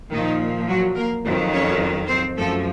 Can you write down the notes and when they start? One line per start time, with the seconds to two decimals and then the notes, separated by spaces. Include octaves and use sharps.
0.11 A#2 D#3 D#4
0.17 F3
0.68 F#3 F#4
0.96 A#3 A#4
1.24 F2 D#3 F#3
1.52 C#4 C#5
2.08 C4 C5
2.36 F#2 F3 A3 A4